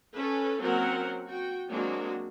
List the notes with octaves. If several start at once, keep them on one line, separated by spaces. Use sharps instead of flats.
C#4 A4 B4
F#3 A#3 C4 C#4 A#4 F#5
F#4 G5
F#3 G#3 A#3 C4 D4 F#4